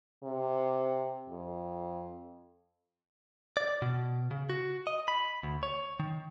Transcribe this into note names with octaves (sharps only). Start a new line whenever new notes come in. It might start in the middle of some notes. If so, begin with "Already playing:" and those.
C3
F2
D5
B2
C#3
F#4
D#5
B5
D2
C#5
D#3